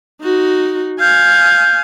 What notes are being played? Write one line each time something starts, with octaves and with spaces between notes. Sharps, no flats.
D#4 F#4
F5 G#5 G6